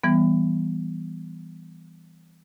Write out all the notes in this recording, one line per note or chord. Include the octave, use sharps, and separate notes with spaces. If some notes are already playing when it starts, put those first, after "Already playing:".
E3 G3 B3